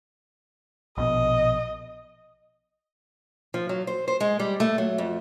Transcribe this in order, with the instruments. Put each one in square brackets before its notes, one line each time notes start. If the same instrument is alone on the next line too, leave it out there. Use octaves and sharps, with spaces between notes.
[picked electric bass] A#1 B2 [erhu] D#5
[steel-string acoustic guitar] F3
F#3
C5
C5
G#3
G3
A3
F#3
F2